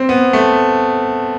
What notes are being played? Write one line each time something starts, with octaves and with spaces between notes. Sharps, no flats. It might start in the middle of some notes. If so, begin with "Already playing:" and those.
Already playing: C4
B3
A3